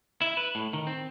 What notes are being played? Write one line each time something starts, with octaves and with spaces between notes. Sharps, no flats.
E4
B4
A2
D#3
C4